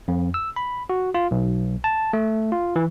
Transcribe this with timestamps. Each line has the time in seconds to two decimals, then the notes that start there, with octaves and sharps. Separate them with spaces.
0.08 F2
0.34 E6
0.56 B5
0.90 F#4
1.14 F4
1.31 B1
1.84 A5
2.13 A3
2.52 F4
2.76 E3